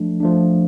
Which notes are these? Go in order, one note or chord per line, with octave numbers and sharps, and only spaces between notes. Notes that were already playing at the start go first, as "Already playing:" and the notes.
Already playing: F3 A3 D4
F3 A3 D4